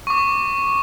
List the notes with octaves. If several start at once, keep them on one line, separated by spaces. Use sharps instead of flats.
C#6 D6